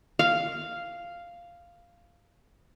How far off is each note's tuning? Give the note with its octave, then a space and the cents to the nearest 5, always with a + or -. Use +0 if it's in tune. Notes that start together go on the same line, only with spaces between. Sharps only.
F5 -5